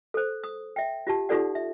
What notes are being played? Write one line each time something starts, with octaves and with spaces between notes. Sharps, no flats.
A4 C5
D#6
E5 G5
F4 G4 A5
D#4 F4 G4 A4 D5 F#5
E5